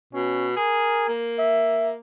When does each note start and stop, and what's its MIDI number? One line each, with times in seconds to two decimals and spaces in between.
0.13 0.55 47
0.13 0.49 61
0.56 1.05 68
0.56 1.17 70
1.08 1.96 58
1.39 1.92 76